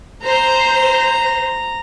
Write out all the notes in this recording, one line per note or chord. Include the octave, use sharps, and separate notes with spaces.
C5 A#5